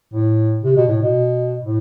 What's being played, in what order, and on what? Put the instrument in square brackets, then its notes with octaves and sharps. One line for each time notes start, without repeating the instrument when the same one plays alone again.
[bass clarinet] A2
C3
B2
A2
B2
A2